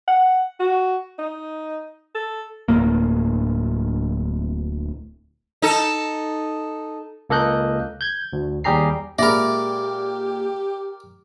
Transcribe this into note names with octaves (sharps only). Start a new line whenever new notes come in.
F#5
F#4
D#4
A4
D1 A2 A#3
D#4 A4
C#2 A#3 A4 D#5 F#6 G6
G6 G#6
D2
D#2 G3 G4 G#4 A#5 C7
A#2 G#3 G4 A#4 D5 E5 B5